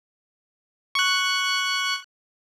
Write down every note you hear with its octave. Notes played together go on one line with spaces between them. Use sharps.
C#6 F#6